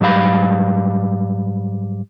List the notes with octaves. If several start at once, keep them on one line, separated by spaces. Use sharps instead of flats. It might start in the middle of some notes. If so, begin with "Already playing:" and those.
G#2 F#3 G3 F5 B5